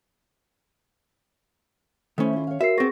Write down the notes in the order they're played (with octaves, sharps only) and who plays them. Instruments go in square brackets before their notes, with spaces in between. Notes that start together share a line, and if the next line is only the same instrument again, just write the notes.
[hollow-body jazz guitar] D#3 C#4 [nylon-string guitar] A3 E4 C5
[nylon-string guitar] E4 F4
C#5 F5
[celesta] F#4 A#4 C7 [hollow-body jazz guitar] E5
[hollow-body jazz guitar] B3 C4 [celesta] G#4 C#6 A#6